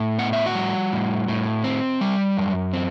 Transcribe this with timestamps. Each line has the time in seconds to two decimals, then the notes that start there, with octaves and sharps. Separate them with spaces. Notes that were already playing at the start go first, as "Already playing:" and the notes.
Already playing: A2
0.18 B3 F#5
0.33 E5
0.46 F#4 F#5
0.55 G3
0.92 A2
1.28 A2
1.64 C4
2.01 G3
2.37 F#2
2.73 C4